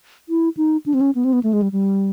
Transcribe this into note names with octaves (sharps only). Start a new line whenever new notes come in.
E4
D#4
D4
C4
C#4
B3
C4
B3
A3
G#3
G3
G3